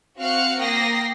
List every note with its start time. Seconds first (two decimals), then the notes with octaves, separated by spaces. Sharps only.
0.18 C4 F#4 F5 F6 F#6 C#7
0.59 A#3 G5 D#6 A#6 C7